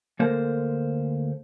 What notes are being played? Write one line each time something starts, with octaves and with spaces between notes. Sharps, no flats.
D2 A#3 A4 A#4 C5